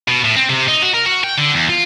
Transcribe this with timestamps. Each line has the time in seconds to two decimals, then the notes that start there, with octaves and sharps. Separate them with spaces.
0.08 B2
0.24 A2
0.36 C4
0.49 C3
0.68 D#4
0.82 F#4
0.94 A#4
1.06 F#4
1.24 G5
1.38 D3
1.54 E2
1.69 F4